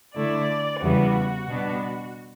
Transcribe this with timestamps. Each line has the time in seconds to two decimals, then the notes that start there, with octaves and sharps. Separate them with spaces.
0.15 D3 A3 E4 D5
0.82 E2 C#3 E3 G3 B3 F#4
1.48 B2 G3 B3 D4